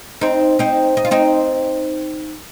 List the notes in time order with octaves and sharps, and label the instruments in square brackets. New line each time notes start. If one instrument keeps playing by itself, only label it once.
[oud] C4 D#4
C4 D#4
D#4
F4
C4 D#4